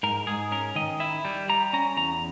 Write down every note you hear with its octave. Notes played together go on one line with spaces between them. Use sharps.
G#2 A#4
G#2 G#4
C#4 A#4
D#3 D#5
E4 E5
G3
G3 A#5
C#4 A#5
E2 A#5